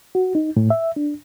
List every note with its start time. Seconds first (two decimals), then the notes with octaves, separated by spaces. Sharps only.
0.15 F#4
0.35 D#4
0.57 A2
0.70 E5
0.96 D4